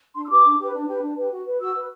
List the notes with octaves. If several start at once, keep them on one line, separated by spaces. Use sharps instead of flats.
D4 C6
E6
G4 B4 D6
D4
G4 B4
D4
G4 B4
D4
G4 B4
F#4
B4
F#4 E6
B4